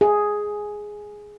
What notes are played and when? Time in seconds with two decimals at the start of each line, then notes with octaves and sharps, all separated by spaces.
0.01 G#4